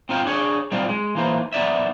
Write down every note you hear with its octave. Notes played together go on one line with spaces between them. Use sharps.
C4 D#4 F4 F#5 G5
D4 G#4 C#5
G3 C4 D#4 F4
G#3
E3 A#3 D#4 C5
B3 D#4 D5 E5